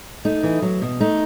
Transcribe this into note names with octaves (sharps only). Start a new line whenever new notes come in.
A3 D#4
E3
F#3
B2
A3 D#4